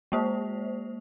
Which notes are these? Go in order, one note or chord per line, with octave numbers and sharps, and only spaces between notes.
G#3 A#3 C5